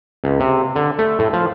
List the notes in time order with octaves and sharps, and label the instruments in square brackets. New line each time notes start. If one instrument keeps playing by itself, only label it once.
[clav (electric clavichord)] C#2
C3
D3
A3
A2
F3